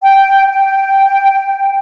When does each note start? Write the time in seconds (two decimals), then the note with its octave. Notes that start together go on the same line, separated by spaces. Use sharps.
0.02 G5
0.51 G5